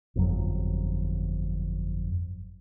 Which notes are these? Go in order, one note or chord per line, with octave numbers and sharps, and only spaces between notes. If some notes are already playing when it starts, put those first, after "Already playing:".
G1 F2 F#3